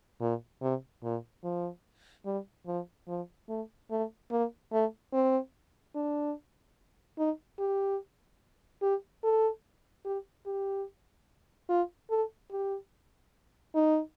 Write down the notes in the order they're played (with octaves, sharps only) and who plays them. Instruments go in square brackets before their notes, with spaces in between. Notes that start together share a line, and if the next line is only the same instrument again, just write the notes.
[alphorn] A#2
C3
A#2
F3
G3
F3
F3
A3
A3
A#3
A3
C4
D4
D#4
G4
G4
A4
G4
G4
F4
A4
G4
D#4